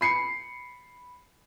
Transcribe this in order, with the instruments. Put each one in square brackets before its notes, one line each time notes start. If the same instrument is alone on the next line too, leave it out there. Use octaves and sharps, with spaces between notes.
[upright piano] B5 C7 C#7